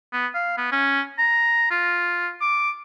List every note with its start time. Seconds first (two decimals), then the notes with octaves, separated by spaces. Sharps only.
0.13 B3
0.34 F5
0.58 B3
0.72 C#4
1.18 A#5
1.71 F4
2.41 D6